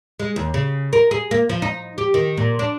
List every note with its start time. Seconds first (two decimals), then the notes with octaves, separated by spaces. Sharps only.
0.19 G#3
0.36 D#2
0.54 C#3
0.93 A#4
1.11 G#4
1.31 A#3
1.49 F3
1.62 D#4
1.98 G4
2.14 D#3
2.37 A#2
2.59 D4